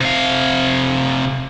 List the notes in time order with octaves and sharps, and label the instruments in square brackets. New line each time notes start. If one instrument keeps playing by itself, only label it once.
[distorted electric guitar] C3 F5